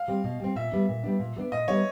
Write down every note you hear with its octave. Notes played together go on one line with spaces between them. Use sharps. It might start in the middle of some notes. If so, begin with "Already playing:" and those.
Already playing: F5
G3 C4
B2
G3 C4
A#2 E5
G3 B3 D4
A#2
G3 B3 D4
A#2
G3 B3 D4
A#2 D#5
G3 B3 D4 C#5